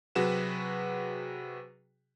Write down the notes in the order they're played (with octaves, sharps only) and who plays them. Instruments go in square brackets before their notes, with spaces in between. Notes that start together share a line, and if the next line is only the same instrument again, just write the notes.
[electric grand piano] C3 F#3 F#4 G#4 B4 E7